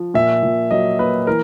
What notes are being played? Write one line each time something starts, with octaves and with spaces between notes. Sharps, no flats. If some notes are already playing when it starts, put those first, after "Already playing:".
Already playing: F3
A#2 E5
A#2
F#3 D#5
A#3 B4
E3 A#4